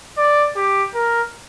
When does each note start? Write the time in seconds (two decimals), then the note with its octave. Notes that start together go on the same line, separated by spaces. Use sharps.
0.17 D5
0.56 G4
0.95 A#4